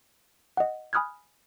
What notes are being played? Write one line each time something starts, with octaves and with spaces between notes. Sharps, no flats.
D#5 F#5
G#5 B5 D#6 F6 F#6 G#6